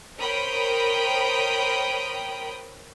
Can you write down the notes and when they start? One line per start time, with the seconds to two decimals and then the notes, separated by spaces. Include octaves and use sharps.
0.18 A#4 C5 C#5 G5 B5 D#6